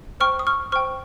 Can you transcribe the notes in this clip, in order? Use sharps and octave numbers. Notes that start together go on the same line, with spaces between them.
C5 G5 C#6 F6
D#6
C#6 F6
C5 G5 C#6 F6